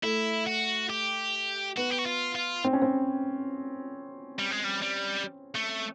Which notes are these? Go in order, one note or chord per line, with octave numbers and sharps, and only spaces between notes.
A3 E4
F#4
G4
B3 F#4
G4
F#4
F4
F4
C4
C#4
C4
G3
G#3
G3
G3
A3